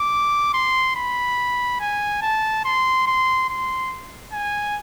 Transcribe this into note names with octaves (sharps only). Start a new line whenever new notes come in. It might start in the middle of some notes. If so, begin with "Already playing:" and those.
Already playing: D6
C6
B5
G#5
A5
C6
C6
C6
G#5